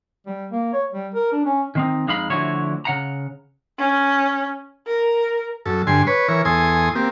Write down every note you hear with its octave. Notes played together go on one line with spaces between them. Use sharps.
G3
A#3
C#5
G3
A#4
D4
C#4
D#3 C4 D#4
F2 G#3 D#4 F5 B5
D2 D3 F3 E4 F#4 C#5
C#3 F#5 A#5
C#4
A#4
F#2 A4
G2 D3 G#5 C6
B4 C#5
E3 A#4 C#5
E2 A4 G#5 C6 D#6
A#3 C4 G4